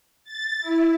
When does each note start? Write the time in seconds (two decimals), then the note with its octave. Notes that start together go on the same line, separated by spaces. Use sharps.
0.24 A6
0.61 E4